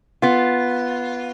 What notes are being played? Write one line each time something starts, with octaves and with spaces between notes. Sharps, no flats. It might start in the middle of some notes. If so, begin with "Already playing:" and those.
B3 F4